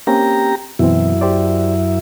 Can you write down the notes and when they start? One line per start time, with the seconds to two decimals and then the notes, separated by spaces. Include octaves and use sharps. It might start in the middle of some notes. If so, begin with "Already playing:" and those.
0.07 A#3 C4 C#4 G4 A#5
0.79 F#2 B2 E3 C4 E4
1.21 G4 C5 D5